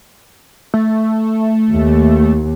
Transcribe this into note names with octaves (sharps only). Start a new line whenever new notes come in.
A3
D#2